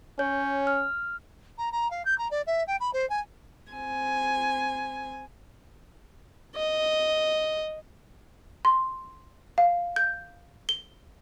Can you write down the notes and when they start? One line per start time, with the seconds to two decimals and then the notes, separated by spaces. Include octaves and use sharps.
0.19 C#4 C#5 G6
0.67 F6
1.58 A#5
1.72 A#5
1.90 F5
2.05 G6
2.18 A#5
2.31 D5
2.46 E5
2.67 G5
2.80 B5
2.93 C5
3.09 G#5
3.72 C4 G#5
6.56 D#5
8.65 C6
9.58 F5
9.96 G6
10.69 G7